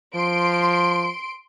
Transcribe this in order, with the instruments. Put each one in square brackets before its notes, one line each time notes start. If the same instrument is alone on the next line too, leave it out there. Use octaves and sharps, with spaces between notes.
[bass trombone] F3 [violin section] C6 D7